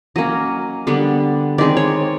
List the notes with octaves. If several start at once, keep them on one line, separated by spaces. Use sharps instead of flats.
F#3 A#3 C#4 D#5
D3 G3 B3 D4
D#3 G#3 C4 D5
C#5